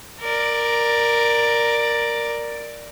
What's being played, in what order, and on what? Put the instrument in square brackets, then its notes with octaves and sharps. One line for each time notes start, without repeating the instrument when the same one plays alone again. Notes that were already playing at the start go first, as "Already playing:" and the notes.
[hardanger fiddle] A#4 D5